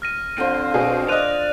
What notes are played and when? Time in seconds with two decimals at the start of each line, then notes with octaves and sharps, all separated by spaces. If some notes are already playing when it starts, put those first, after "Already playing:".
0.02 F6 A#6 D#7
0.38 D3 F3 C4
0.74 B2 G#4
1.08 C5 D5 D#5 F#6 D#7 F7